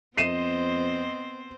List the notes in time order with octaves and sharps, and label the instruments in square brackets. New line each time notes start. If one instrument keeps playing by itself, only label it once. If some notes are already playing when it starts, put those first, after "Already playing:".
[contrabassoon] F2 [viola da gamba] B3 C4 C5 [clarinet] D#5 [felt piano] C7 D#7 E7